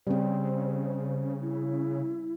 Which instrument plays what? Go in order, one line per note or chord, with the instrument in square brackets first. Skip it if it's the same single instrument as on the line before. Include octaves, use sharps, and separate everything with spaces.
[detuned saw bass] C#3 [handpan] G3 C4 [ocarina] C5
[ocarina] E4